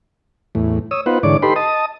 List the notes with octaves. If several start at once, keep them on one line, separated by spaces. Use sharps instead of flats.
E2 A2
C#5 D#6 E6
B3 D#4 F4 B4 C5 F#5
G#2 D3 E3 C#5 D5 D6
D#4 G4 A4 B4 B5 C6
D#5 A5 D#6